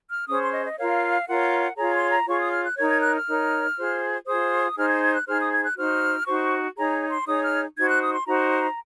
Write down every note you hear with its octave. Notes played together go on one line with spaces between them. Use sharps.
F6
C#4 G#4 C5 D#6
C6
D#5
D#5
F4 A#4 C#5 F5
F4 A#4 C#5 F#5
F4 G#4 C#5 A#5
C6
A#5
F4 G#4 C#5 C#6
D#6
F6
F#6
D#4 A#4 C#5 G#6
G#6
F#6
F6
D#4 A#4 C#5
F4 G#4 C5
F4 G#4 C5 D#6
D#4 G#4 C5 F6
G#6
G#6
F#6
D#4 G#4 C5 F6
D#6
G#6
F#6
D#4 F#4 C5 F6
D#4 F#4 C5 C#6
D#4 G#4 C#5 A#5
C6
D#4 G#4 C#5 D#6
F6
D#4 F#4 C5 G#6
F#6
D#6
C6
D#4 F#4 C5 A#5